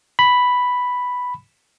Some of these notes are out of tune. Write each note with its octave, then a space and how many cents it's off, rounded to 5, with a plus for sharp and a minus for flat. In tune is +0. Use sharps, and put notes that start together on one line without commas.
B5 +0